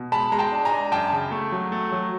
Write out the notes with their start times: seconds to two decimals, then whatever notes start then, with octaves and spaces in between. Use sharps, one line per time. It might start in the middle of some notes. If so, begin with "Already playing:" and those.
Already playing: B2
0.12 G#3 A5 B5
0.32 G#3 A#5
0.39 G5 A5
0.52 D4
0.65 G#5 A#5
0.72 D4
0.92 F#2 G5 A5
1.12 C#3
1.31 A3
1.52 F#3
1.72 A3
1.92 F#3